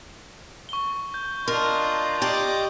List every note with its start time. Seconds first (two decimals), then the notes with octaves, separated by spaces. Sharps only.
0.69 C#6 G7
1.14 G6
1.48 D4 F4 A#4 D#5
2.22 G4 D5 D#5 D6